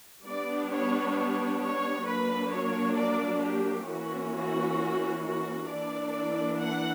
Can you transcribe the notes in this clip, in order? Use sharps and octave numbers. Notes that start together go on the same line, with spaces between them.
G3 B3 D4 D5
C#5
C#5
C#5
F#3 A#3 D4 B4
C#5
D5
G4
E3 A#3 C#4 F#4
F#4
F#4
E3 A#3 D4 D5
F#5